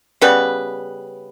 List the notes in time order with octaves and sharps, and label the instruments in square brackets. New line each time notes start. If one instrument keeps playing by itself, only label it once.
[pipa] C#3 G3 B3 B4